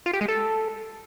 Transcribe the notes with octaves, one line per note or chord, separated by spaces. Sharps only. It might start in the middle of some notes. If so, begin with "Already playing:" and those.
F4
G4
G#3
A4